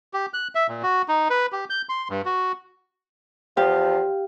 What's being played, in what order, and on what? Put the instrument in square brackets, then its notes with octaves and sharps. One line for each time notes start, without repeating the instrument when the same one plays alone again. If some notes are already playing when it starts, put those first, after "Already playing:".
[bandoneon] G4
F#6
E5
A#2
F#4
D#4
B4
G4
G6
C6
G2
F#4
[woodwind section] E2 F3 [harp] G4 F5